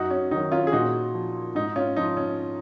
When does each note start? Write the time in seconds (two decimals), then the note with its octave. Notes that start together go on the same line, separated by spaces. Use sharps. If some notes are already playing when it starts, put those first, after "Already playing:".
Already playing: F#2 D#4 F#4
0.11 C#4
0.31 D#3 F#3 D#4
0.52 C#4 F4
0.67 G#4
0.72 A#2 D#4 F#4
1.14 F3
1.55 G#2 D#4
1.76 C#4 F4
1.96 F3 D#4
2.17 C#4